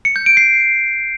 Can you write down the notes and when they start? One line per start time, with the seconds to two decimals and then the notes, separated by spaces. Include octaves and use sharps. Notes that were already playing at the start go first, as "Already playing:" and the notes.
0.05 C#7
0.16 G6
0.26 D7
0.37 C7